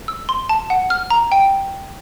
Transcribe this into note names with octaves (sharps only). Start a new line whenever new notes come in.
E6
C6
A5
F#5
F6
A#5
G5